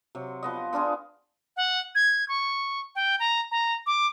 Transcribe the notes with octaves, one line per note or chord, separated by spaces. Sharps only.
C3 F#3
F3 B3 D#5
B3 D4 F4 G#4
F#5
G#6
C#6
G5
A#5
A#5
D6